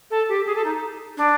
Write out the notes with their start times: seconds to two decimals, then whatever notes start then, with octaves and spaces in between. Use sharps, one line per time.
0.11 A4
0.29 G4
0.46 G#4
0.55 A4
0.64 D#4
1.17 D4